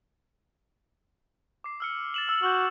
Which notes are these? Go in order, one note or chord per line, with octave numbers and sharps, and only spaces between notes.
D6 C7
E6 F6 C#7
A6 E7 F#7
E6 F6
F#4 F6 G6